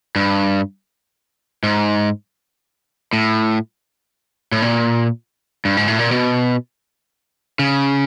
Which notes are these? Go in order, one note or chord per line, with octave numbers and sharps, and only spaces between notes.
G2
G#2
A2
A2
A#2
G2
G#2
A2
A#2
B2
C#3